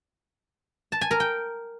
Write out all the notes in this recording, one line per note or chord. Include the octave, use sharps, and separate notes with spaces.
A5
G#5
A#4
G5